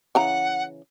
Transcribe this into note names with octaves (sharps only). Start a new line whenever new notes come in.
C#3 E3 F#5 A#5